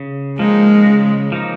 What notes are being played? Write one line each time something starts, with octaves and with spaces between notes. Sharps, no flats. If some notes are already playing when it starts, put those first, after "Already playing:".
Already playing: C#3
F3 G#3 A#3 D#4
C#3
F3 A#3 D#4